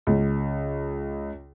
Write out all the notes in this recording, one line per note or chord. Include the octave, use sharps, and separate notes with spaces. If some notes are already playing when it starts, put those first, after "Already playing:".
C#2